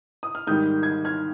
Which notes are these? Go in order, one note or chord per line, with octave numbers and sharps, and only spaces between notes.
D#6
F6
G#2 D#3 G3 D#6 G6
G#6
F6 G#6